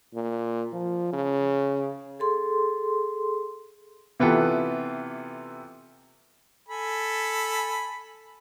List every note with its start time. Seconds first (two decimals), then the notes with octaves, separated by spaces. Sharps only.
0.14 A#2
0.73 F3
1.13 C#3
2.19 G#4 A4 C6
4.20 C3 E3 B3 F4 G4 A4
6.68 A4 G#5 B5